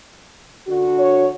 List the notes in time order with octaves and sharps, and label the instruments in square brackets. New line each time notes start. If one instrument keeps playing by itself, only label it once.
[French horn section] D3 D4 F#4
[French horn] C#5